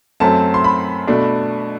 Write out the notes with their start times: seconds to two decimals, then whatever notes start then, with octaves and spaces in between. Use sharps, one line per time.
0.20 F#2 F#3 A3 C4 A5
0.54 C6
0.64 B5
1.07 B2 A3 D4